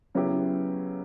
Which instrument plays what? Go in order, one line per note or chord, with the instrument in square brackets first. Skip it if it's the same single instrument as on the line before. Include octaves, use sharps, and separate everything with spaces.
[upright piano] C#3 F#3 B3 E4 G4